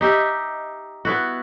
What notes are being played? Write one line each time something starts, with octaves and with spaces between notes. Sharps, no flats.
D#4 G4 E5
B3 E4 F#4